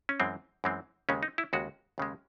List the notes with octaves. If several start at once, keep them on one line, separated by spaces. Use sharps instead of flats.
C#4
F#2 E3 G#3 C4
F#2 E3 G#3 C4
D#2 C#3 G#3 C#4
D#4
E4
D#2 C#3 G#3 F#4
D#2 C#3 G#3